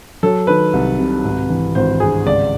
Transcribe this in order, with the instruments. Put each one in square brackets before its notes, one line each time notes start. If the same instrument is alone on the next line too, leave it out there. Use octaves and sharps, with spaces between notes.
[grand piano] F#3 A4
D#3 B4
C2
C3
G#1
E3
G#1 C5
G2 G#4
C#2 D5